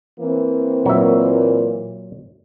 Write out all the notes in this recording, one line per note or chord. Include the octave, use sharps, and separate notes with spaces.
E3 A#3 C4
A#2 F#3 E5